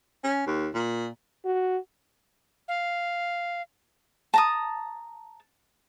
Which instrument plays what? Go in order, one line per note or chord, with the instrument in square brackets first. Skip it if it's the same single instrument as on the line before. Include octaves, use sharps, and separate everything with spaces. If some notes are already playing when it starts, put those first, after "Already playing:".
[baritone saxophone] C#4
D#2
A#2
[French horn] F#4
[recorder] F5
[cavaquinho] A5 A#5 D#6